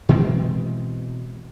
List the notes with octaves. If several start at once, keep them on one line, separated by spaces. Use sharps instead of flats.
B2 E3 G#3 C4